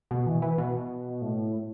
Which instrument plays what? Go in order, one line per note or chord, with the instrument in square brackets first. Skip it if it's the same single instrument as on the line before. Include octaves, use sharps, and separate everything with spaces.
[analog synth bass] B2
E3
E3
B2
A2